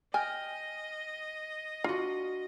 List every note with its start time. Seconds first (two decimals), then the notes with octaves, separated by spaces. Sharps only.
0.14 D#5 G5 G#5 F6
1.84 D4 F4 F#4